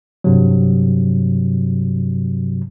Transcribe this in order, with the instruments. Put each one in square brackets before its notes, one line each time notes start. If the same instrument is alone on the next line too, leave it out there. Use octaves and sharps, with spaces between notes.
[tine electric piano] G2 C3 F#3